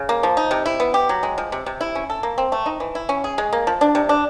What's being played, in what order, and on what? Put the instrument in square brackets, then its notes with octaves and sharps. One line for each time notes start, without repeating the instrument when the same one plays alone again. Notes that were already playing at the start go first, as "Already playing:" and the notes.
Already playing: [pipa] C#3
A#3
F3
D#4
C3
E4
B3
G4
F#3
G#3
F3
C3
C3
E4
C#4
A4
A#3
C4
A3
D#4
E3
E4
C#4
G#4
G#3
A#3
F3
D4
C3
D4